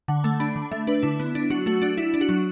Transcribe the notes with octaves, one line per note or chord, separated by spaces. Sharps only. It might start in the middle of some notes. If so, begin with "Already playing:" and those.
D3 F#5
A3 A5
D4 B5
D3
A3 E5
D4 B4
D3 E4
B3
D4
F#3 F#4
A3 F#4
D4 F#4
D4 E4
D4
F#4
F#3